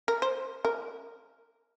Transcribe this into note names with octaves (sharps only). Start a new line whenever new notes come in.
A#4
C5
A#4